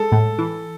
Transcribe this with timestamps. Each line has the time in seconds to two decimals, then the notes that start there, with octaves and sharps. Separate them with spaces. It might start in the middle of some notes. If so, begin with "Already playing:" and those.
Already playing: G#3 A4
0.12 A2
0.39 E3